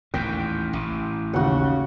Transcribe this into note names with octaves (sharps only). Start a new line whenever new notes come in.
A1 D#2 A#2 G5
A1
D#2 C#3 F#4 F#5